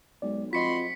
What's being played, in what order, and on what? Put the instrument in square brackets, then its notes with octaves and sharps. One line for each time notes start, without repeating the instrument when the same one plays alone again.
[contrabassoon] B1 [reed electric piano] G#3 D5
[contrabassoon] F2 [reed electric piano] F4 D#5 [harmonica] F#4 B5 C6 [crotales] B6 C#7